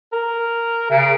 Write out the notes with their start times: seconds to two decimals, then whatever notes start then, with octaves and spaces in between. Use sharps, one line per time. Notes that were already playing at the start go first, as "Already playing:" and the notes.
0.12 A#4
0.90 C#3